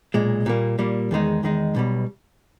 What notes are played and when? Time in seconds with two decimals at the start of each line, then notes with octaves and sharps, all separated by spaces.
0.14 B1 A#2 G#3
0.46 A#2 G3 A#3
0.79 A#2 G3 A#3
1.11 E2 D#3 G#3 D#4
1.43 E2 D#3 G#3 D#4
1.75 B1 B2 G3